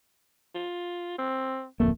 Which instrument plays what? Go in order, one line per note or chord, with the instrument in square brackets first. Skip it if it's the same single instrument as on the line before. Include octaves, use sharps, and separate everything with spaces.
[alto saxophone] F4
C4
[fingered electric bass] D1 F2 A#3 [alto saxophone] A3